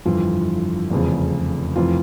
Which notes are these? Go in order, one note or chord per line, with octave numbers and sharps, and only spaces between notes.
G1 F2 E3 F4
F1 E2 C#3 F3
F1 F2 E3 F4